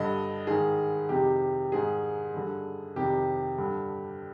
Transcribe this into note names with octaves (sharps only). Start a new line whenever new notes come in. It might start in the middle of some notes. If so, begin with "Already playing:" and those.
Already playing: G2 D3 D#5
G#2 D#3 G#4
F2 C3 D#3 G4
G#2 D#3 G#4
G2 D3
F2 C3 D#3 G4
G2 D3